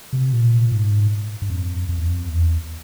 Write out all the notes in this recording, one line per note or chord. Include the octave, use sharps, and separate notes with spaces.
C3
A#2
G#2
G2
F2
F2
E2
F2
E2